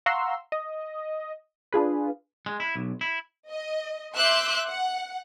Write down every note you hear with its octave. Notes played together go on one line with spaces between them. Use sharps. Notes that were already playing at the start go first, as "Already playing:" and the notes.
F5 F#5 A#5 C6 C#6 E6
D#5
D4 F4 G#4 B4
G#3
E4
B1
E4
D#5
E5 C6 D6 E6 F#6 G6
F#5